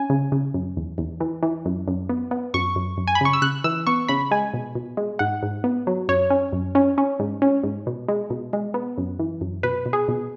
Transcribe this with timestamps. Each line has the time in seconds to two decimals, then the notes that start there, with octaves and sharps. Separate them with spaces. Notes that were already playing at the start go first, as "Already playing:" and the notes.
Already playing: C#4 G#5
0.10 C#3
0.32 C#3
0.54 F#2
0.77 E2
0.98 E2
1.20 E3
1.43 E3
1.66 F#2
1.88 F#2
2.09 B3
2.31 B3
2.54 F#2 C#6
2.76 F#2
2.98 F#2
3.08 G#5
3.15 B5
3.21 C#3 C#6
3.33 E6
3.42 C#3 F#6
3.64 E3 E6
3.87 B3 C#6
4.09 C#3 B5
4.31 G#3 G#5
4.54 B2
4.75 B2
4.97 G#3
5.19 G#2 F#5
5.43 G#2
5.64 B3
5.87 F#3
6.08 F#2 C#5
6.30 C#4
6.53 F#2
6.75 C#4
6.98 C#4
7.20 G#2
7.42 C#4
7.64 G#2
7.87 B2
8.08 G#3
8.30 B2
8.53 G#3
8.74 B3
8.98 F#2
9.19 E3
9.41 F#2
9.63 B2 B4
9.86 B2
9.93 G#4
10.08 B2